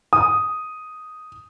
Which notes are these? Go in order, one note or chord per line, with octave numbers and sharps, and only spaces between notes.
D#6